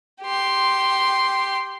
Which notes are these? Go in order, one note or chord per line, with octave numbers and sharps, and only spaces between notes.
G4 C6